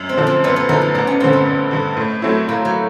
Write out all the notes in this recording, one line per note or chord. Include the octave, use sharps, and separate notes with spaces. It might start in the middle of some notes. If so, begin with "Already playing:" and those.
Already playing: F#2
C4
D3 F3
C4
F#2 B3
B3
D3 F3 D#4
D#4
A1 D4
C#4
G2 D3 C4
B3
A1
G2 D3
A2
F#3 A3 C4 E4
A2 A#3
F#3